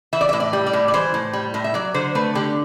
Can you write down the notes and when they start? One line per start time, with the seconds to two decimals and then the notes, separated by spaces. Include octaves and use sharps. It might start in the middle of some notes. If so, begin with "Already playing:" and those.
0.13 E3 E5
0.21 D5
0.29 E5
0.33 A2
0.40 D5
0.53 G3
0.66 D5
0.73 A2
0.88 D5
0.94 E3 C5
1.14 A2
1.33 G3
1.54 A2
1.64 E5
1.74 F#3 D5
1.94 D3 C5
2.15 A3 B4
2.35 D3 G4